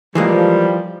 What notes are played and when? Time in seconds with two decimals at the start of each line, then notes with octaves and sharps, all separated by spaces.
0.15 E3 F3 G3 G#3 A#3